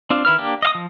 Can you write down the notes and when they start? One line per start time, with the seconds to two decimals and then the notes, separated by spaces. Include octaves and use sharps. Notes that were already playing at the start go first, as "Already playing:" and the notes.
0.10 C4 D4 F4
0.25 D#3 E4 B4 F6
0.38 A#3 D4 G4
0.62 D#5 F5 D#6
0.75 F3